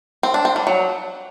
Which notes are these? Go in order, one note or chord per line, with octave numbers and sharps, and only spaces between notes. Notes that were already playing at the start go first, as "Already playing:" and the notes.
C4
D4
C4
G3
F#3